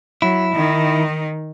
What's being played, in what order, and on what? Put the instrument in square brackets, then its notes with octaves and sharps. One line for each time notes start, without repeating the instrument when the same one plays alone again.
[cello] F#3 [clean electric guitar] E4
[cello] D#3 D#4